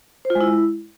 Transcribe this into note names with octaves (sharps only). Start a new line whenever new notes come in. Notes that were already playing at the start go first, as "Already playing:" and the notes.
C5
F4
G#3
E4